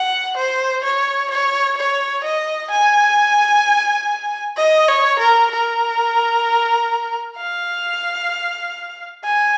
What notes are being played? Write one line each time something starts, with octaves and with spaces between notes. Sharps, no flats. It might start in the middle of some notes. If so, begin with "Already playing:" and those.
Already playing: F#5
C5
C#5
C#5
C#5
D#5
G#5
D#5
C#5
A#4
A#4
F5
G#5